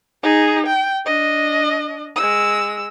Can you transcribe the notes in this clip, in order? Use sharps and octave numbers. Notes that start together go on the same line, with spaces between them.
D#4 G#4
G5
D4 D#5
G#3 E6